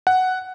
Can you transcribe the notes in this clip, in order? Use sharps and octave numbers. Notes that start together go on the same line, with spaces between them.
F#5